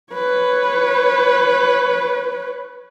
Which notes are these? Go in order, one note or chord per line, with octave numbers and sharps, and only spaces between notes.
B4 C#5